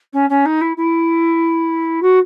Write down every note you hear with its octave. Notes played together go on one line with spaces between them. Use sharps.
C#4
C#4
D#4
E4
E4
F#4